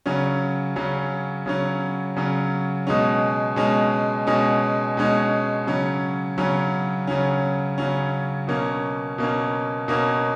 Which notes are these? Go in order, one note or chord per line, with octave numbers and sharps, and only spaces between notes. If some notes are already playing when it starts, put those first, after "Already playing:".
C#3 F#3 C#4
C#3 F#3 C#4
C#3 F#3 C#4
C#3 F#3 C#4
B2 G#3 C#4
B2 G#3 C#4
B2 G#3 C#4
B2 G#3 C#4
C#3 F#3 C#4
C#3 F#3 C#4
C#3 F#3 C#4
C#3 F#3 C#4
B2 A#3 C#4
B2 A#3 C#4
B2 A#3 C#4